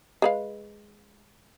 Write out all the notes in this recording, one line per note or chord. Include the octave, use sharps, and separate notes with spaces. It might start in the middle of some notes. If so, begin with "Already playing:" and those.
G#3 B4 F5